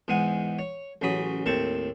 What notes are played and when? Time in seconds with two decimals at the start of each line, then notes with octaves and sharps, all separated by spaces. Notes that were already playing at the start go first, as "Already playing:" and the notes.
0.08 E2 G#2 G#3 F#5 G#5
0.59 C#5
1.02 A1 C#3 F#3 B5 D#6
1.46 D#2 A2 C4 A5 C#6